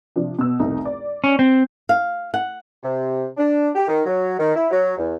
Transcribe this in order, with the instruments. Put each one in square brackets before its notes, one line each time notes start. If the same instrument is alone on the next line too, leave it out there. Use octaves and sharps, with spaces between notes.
[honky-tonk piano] C3 F3 D4
B2 E6
F1 C2 D#4
D5
[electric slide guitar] C#4
C4
[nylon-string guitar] F5
F#5
[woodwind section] C3
D4
G4
D#3
F#3
D#3
E4
F#3
E2